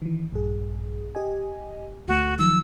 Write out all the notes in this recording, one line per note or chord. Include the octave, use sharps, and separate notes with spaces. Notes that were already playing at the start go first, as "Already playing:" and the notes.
D#3 E3
A#1 G2 G#4
G4 D#5 G#5
D2 A3 F#4
D#3 F3 F#3 E6